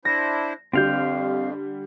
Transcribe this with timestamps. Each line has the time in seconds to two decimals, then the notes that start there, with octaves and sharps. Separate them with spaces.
0.05 D4 E4 C5 A#6
0.73 F2 D3 G3 C4 F5 G6